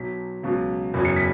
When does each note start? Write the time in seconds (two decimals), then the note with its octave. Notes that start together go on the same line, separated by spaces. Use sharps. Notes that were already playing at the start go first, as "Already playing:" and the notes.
Already playing: B1 B2 F#3 B6
0.43 C#2 B2 F#3
0.94 F#1 E2 B2 F#3
1.05 C#7
1.16 B6